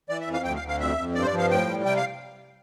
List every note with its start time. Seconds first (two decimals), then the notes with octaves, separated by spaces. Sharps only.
0.09 E3 D5
0.21 E5
0.27 F2
0.33 F5
0.44 D2 G5
0.56 F5
0.62 D2
0.68 F5
0.80 F2 E5
0.98 F2
1.15 G2 D5
1.22 C5
1.27 D5
1.33 F3
1.38 F5
1.50 A2 G5
1.67 G3
1.85 C3 G5
1.97 F5